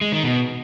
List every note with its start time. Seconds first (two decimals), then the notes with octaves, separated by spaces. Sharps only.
0.01 G#3
0.12 D#3
0.23 B2